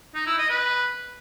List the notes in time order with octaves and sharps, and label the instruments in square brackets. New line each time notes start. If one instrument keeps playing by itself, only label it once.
[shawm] D#4
E4
D#5
B4